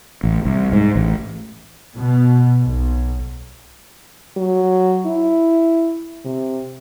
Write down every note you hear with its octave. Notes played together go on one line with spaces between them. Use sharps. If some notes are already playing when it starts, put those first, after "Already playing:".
A1
C2
G#2
A1
B2
B1
F#3
E4
C3